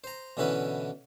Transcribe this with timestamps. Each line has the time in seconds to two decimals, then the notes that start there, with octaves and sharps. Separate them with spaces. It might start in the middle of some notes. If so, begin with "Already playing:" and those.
0.04 C5 A#5
0.37 B2 D3 E3 C#4 E4 B4